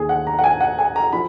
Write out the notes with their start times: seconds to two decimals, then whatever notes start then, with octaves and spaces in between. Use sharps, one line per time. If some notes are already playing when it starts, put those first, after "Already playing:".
Already playing: D#2 D#3 A#3 G#4
0.09 F#5
0.27 A#5
0.39 F#5
0.44 G#5
0.61 F#5
0.79 G#5
0.96 A#5
1.13 F3 B5